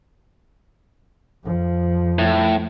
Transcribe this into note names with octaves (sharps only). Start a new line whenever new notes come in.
F2 F3
A2